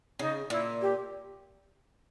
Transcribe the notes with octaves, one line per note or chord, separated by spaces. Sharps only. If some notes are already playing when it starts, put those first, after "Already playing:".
C#3 D#4
A#2 E4
G4